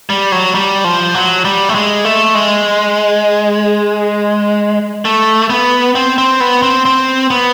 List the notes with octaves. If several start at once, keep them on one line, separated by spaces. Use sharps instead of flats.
G3
F#3
G3
F3
F#3
G3
A3
G#3
A3
G#3
A3
B3
C4
C4
B3
C4
C4
B3